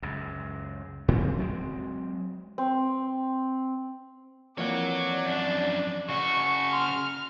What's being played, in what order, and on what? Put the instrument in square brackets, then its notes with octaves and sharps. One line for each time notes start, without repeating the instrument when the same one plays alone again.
[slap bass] C#2 F#2
G#2 C#3 C4 C#4
F#3 G#3 C4
[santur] C4
[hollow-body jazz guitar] F2 E3 A#3 [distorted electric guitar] C#5 F#5 [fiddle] D5
[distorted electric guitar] F#2 D4
[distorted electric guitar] C#3 F#4 [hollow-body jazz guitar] D#5 [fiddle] C#6
[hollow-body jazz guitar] C6 [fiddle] F6